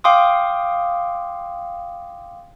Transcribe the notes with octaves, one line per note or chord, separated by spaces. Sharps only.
F5 G5 C6 D6 D#6